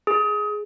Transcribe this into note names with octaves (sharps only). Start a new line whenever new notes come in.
G#4